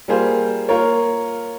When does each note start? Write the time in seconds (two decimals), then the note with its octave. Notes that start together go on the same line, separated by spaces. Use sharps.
0.08 G3 A#3 F4 G#4 C5
0.69 A#3 F4 A#4 C#5